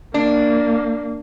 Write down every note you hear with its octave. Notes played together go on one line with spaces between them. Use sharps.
A#3 D4